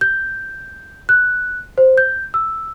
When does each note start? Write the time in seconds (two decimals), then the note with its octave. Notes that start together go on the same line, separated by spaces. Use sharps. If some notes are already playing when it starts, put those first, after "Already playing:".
0.01 G6
1.09 F#6
1.78 C5
1.98 G6
2.34 E6